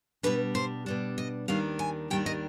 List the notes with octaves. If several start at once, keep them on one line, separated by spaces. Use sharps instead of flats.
B2 G3 D4 B4
C5
B2 G3 D4
D#5
D#2 D#3 G3 D4 F5
G#5
D#2 D#3 G3 D4 G5
D#5